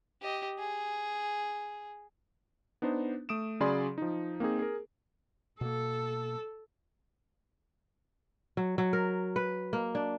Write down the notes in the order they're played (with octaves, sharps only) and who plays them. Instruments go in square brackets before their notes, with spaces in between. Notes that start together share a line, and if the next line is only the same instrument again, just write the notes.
[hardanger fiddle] G4 D#5
G#4
[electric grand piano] B3 D4 D#4 C5
A3 D#6 D7 E7
C#3 F#3 G#4 D5 B5 C6
F3 D#4
A#3 C4 D#4 G#4
G#4 A#4
[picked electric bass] B2 A#3 [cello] A4
[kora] F#3
F#3
A#4
B4
A#3
D4